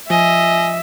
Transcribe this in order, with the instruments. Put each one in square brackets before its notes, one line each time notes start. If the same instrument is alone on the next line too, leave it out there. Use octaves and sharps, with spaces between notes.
[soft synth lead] F3 [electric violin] D#5 [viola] E5 [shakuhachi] G#5